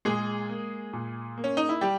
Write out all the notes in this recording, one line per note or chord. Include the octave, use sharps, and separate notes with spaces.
A#2 G#3 G#4
A#3
A#2
A#3
C#4
D#4
E4
G3 G4